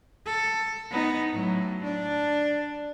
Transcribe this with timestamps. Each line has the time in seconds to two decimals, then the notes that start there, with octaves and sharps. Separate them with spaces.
0.26 A4
0.90 B3 D#4
1.34 A2 F#3
1.84 D4